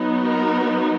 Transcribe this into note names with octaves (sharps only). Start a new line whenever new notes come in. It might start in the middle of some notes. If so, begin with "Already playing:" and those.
Already playing: F#3 B3 D#4
A#4